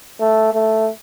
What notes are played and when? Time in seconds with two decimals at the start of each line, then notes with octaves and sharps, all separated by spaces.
0.20 A3
0.54 A3